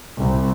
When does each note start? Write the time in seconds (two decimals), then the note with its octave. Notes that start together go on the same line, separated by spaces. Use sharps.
0.18 C2